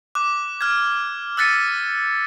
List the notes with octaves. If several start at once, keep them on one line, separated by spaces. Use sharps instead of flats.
D6 F#6
F6 F#6 G#6
E6 F#6 A6 B6 C#7 D#7